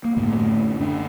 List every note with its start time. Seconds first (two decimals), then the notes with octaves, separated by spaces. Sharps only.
0.04 A#3
0.16 F#2 A2 D3 A3
0.80 D3 D4